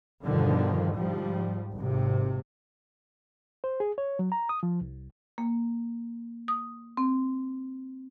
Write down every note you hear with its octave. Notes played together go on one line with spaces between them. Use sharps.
E2 G2 B2 D3 D#3 F3
G#2 F3 G3
G#1 C3
C5
G#4
C#5
F#3
A#5
D#6
F3
C2
A#3
D#6
C4